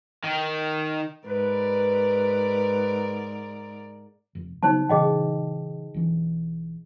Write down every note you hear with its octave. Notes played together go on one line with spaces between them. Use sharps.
D#3
G#2 A#4 B4 D5
F1
C#3 F#3 B3 D#4 C5 A5
A#2 C#3 E3 G#4 D#5 G5
B1 E3